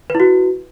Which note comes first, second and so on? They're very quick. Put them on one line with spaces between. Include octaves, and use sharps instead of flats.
B4 E4 F#4